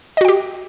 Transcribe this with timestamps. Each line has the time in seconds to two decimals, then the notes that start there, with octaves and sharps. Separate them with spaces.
0.17 D#5
0.21 F#4
0.25 G5
0.28 G4